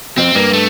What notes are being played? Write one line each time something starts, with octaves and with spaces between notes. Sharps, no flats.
F2 C4
G2 A#3
A3